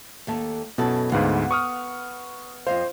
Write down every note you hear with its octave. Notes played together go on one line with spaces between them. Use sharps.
D#2 A3 A4
F#2 B2 E4 A4
D2 G#2 B3 F5 F#5
C#6 D#6 F6
F2 C5 D#5 F5